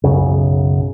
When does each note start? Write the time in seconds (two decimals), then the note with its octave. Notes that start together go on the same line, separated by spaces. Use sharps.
0.04 B1 F#2 C#3